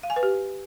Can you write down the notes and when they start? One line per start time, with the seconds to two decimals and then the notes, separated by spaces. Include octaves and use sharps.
0.03 F5
0.10 G#5
0.16 B4
0.23 G4